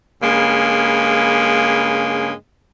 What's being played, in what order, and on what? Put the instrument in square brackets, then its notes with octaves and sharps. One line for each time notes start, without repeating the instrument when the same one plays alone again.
[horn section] G2 C#3 G#3 A#3